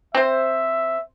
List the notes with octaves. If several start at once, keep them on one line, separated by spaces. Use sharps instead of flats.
C4 C5 E5